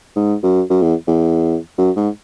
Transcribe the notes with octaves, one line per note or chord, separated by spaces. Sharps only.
G#2
F#2
F#2
E2
E2
F#2
G#2